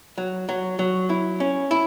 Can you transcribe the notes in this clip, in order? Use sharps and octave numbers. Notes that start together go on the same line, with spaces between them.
F#3
F#3
F#3
E4
C#4
E4